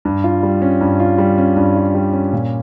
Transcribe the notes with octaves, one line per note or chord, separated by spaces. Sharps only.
G2
F4
G3
C#4
G2
F4
G3
C#4
G2
F4
G3
C#4
A#2